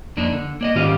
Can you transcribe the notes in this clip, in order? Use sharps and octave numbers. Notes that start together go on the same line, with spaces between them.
F2 A#3 D4 D#4
D3
A#3 D5 D#5
G#2 D#3 C#4 F4 G4 F5